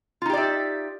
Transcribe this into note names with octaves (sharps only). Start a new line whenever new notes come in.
D#4 F4 G4 D5 E5